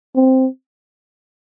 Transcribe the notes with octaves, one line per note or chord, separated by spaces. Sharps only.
C4